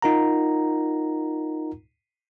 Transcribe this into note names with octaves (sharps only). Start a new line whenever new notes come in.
D#4 F4 A#4 F#5 A#5